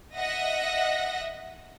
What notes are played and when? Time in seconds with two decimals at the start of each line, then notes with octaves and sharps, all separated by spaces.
0.16 D#5 E5 F#5 A#6